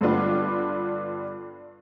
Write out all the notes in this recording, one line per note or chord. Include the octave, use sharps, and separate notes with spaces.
G2 D3 G3 B3 D4 F4